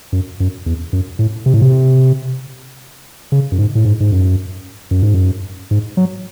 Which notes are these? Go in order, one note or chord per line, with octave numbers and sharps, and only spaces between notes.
F#2
F#2
E2
F#2
A2
C3
A2
C3
C#3
F#2
G#2
A2
G#2
G#2
F#2
F#2
G#2
F#2
G#2
F#3